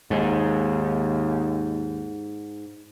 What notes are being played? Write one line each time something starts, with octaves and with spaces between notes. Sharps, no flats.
D#2 G#2